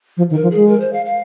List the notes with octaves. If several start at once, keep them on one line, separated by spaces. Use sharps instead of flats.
F3
D#3
A#4
F3
G#3 G#4
A#4
C5
F5
F5